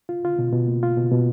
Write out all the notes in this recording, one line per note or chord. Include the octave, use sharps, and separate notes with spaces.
F4
F4
B2
B2
A#3
F4
B2
B2